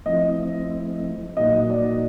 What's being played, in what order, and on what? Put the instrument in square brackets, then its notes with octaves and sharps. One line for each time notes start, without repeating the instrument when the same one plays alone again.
[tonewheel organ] F3 A3 C4 E4 [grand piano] D#5
[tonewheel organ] A#2 F#3 A#3 D#4 F#4 [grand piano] D#5
[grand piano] D5